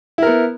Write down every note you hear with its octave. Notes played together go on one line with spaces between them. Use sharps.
B3 E4 A#4